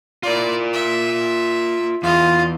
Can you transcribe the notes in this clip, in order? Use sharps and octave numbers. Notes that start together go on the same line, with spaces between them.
E4 F4 A#4 D5
E5
E2 F4 D#5 F5